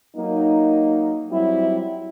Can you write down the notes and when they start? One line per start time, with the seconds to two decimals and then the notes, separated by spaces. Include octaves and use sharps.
0.16 F#3 A#3 D#4
1.30 F#3 G3 C4 E4